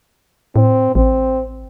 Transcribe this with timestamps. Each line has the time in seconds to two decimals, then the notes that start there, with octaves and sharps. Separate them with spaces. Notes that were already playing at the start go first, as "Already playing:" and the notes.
0.56 A2 C4
0.95 A1 C4